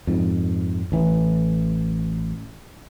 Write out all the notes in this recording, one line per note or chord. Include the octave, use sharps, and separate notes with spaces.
F2 G#2
A1 E3